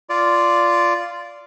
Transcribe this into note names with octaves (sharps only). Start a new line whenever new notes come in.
F4 D5